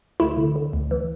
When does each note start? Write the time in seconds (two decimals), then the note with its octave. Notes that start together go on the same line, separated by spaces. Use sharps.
0.20 D2 E4
0.37 D3
0.56 D3
0.73 D2
0.91 E3